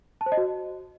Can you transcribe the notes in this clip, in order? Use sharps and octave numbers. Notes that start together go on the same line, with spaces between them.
A5
C5
D#5
F#4